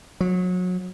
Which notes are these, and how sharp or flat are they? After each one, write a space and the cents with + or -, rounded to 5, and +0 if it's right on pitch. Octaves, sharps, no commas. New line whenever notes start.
F#3 -30